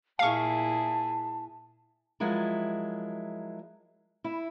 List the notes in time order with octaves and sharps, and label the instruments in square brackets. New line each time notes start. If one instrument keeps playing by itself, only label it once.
[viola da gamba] A#2 E4 G#4 [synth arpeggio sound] F5 C#6 [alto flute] A5
[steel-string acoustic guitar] F3 F#3 G#3 E4 A#4
E4